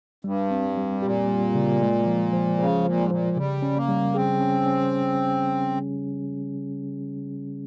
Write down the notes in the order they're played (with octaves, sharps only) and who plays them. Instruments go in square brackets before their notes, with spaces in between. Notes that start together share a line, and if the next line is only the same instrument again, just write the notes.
[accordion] G2 [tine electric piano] G3
[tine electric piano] C4
G3
[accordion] A#2 [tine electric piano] G4
[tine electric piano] G3
C#3
G#3
F3
F3
[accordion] C#3 [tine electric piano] F3
[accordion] A#2 [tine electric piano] F3
[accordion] G#2
[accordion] A#2 [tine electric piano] F3
[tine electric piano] C#3 [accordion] G3
[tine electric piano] C#4
[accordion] A#3
[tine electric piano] G3
[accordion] C4 [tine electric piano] G#4
[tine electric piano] C#4
C#4